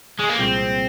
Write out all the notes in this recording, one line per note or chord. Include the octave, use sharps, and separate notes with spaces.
G#3
A#3
C2 A#2 F3 G#3 C4